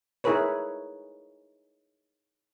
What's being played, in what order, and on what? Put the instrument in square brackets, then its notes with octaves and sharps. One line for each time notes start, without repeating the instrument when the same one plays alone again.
[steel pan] D#4 E4 G#4 A#4 B4 C#5